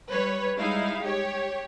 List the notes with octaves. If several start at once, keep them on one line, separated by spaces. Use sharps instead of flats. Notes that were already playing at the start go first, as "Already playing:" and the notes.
G3 B4 C#5
G3 G#3 D#4 E4 F5
G4 C#5